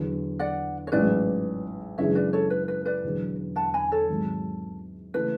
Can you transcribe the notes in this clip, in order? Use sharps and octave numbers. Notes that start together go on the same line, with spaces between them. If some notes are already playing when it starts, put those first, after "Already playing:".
Already playing: E2 D3 F#3
D5 F#5
C#5
A1 G#2 F#3 B4 D5
F#2 C#3 E3 G#3 D4 C#5 E5
B4 D5
A4 C#5
B4
B4
B4 D5
E1 E2 D3 F#3
F#5 A5
G#5 B5
A4 C#5
G#1 G#2 F#3
C#3 E3 A3 B4